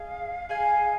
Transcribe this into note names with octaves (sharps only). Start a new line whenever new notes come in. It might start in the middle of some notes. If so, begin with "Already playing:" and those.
Already playing: G#4 D#5 F5
G#4 D#5 F5 G#5